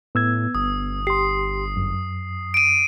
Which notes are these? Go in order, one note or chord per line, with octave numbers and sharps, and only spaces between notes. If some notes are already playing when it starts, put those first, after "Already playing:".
A2 B3 E6 G#6
G1 D#6
G4 C6 C7
F#2
D7 D#7